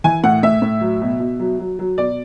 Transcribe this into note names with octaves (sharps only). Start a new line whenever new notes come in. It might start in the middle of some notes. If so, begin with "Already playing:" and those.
E3 G#5
A2 F#5
A2 E5
A2
F#3
B2
B2
F#3
F#3
F#3
B2 D5